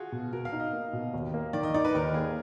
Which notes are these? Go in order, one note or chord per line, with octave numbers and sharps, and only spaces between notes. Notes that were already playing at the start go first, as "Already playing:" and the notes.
Already playing: F4 F#4 G#4
B2
B2 A#4
F5
D#4
D#5
A#3
B2
D#2
A#3
D#3 D5
D#5
D#4 D5
B4
D#2 A#4
A#3 G#4